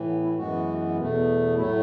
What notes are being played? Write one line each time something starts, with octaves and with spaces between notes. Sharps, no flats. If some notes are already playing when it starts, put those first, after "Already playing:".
Already playing: A2 E3
B3
E4
F#2 E3 G#3 B3 F#4
E2 B2 A3
A2 F#3 A3 E4